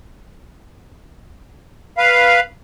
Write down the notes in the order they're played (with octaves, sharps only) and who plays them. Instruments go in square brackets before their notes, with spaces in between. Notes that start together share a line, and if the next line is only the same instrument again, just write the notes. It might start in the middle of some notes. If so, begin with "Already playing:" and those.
[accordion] B4 F5